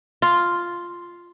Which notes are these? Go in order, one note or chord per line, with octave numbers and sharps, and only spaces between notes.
F4